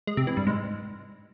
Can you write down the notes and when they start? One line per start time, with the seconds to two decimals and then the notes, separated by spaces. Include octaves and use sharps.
0.07 G#3
0.17 C3
0.27 E3
0.37 G2
0.47 G#2